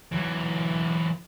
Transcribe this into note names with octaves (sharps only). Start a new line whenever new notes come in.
E3 F#3